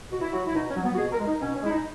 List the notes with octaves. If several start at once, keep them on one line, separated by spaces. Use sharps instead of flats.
B2 F#4
E4
F#3 F#4
E4
B2 D#4
C#4
F#3
B3
F#4
B2 G#4
A#4
G#3
D#4
B2 C#4
C#4
G#3 E4
D#4